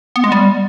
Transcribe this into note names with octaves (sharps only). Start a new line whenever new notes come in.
B3
G#3
G3